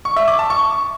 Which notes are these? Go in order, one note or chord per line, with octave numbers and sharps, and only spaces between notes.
C#6
E5
D6
A5
C#6